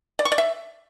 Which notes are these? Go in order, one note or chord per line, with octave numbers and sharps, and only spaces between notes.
D5
C#6
D5
E5